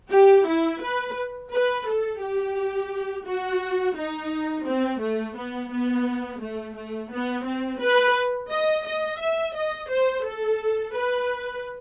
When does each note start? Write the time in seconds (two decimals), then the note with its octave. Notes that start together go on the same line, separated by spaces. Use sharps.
0.12 G4
0.48 E4
0.82 B4
1.52 B4
1.87 A4
2.22 G4
3.27 F#4
3.96 D#4
4.66 C4
5.01 A3
5.37 B3
5.71 B3
6.41 A3
6.76 A3
7.11 B3
7.45 C4
7.81 B4
8.51 D#5
8.86 D#5
9.21 E5
9.55 D#5
9.90 C5
10.25 A4
10.95 B4